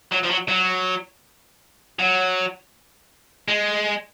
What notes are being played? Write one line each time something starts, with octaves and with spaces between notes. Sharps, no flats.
F#3
F3
F#3
F#3
F#3
G#3